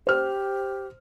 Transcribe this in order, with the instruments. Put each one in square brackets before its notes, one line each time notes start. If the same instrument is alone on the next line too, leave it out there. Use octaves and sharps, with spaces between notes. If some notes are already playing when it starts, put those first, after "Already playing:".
[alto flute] G4 [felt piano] C5 F6